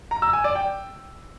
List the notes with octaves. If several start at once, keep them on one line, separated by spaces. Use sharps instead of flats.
A#5
E6
G#5
D5
G5